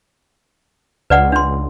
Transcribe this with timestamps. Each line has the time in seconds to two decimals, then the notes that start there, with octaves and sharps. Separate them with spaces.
1.10 C#2 B4 D5 F#5
1.32 D4 C6